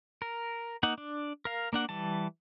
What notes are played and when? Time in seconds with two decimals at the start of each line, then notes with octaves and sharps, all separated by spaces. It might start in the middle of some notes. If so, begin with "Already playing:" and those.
0.22 A#4
0.83 A#3 D#4 F#5
0.98 D4
1.45 A#4 F5
1.73 A#3 D4 F#5
1.89 E3 G3 A5